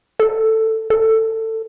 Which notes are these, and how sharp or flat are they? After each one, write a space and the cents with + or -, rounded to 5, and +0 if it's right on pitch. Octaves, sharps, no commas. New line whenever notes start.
A4 +10
A4 +20